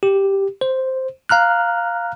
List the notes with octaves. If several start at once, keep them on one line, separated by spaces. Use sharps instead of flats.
G4
C5
F5 A#5 F6 F#6